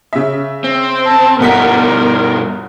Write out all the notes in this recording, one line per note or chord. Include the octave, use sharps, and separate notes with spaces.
C#3 E5
C4
A5
G1 B2 G3 A#4 F#5 B6